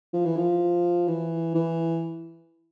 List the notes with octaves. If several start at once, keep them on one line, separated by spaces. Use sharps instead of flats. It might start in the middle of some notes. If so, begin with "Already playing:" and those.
F3
E3
F3
E3
E3